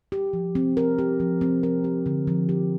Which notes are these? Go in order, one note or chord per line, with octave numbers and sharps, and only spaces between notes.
G4
F3
C4
A#4
G4
F3
C4
A#4
G4
D3
F3
G4